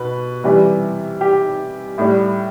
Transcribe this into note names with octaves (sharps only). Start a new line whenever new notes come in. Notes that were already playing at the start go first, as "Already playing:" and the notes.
Already playing: B2 B4
C3 E3 G3
G4
A2 G3